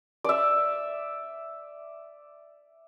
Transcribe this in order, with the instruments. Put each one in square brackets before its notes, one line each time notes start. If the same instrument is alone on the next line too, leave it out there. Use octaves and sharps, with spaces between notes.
[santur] D5 E5